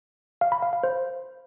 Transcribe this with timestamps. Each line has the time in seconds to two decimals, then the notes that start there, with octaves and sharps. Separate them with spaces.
0.41 F5
0.52 B5
0.62 F5
0.73 F5
0.83 C5